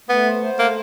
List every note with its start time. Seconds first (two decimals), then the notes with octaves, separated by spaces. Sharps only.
0.09 A3 B3
0.26 C5
0.42 C5
0.59 A3 A#3